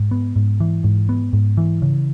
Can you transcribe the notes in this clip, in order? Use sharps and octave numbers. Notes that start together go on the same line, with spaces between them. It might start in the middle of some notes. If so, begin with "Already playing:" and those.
Already playing: G#2
B3
G#2
E3
G#2
B3
G#2
E3
C#3